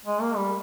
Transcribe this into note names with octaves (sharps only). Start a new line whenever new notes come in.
G#3
A#3
G3